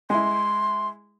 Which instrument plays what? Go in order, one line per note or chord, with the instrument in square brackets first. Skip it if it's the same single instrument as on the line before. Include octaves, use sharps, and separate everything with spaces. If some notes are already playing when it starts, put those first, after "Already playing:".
[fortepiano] G#3 E4 [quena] C6